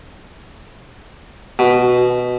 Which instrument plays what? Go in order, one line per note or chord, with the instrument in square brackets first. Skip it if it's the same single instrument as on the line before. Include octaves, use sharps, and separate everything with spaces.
[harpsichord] B2